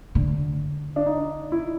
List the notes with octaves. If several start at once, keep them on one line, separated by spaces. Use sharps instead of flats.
D3
D4
D#4
E4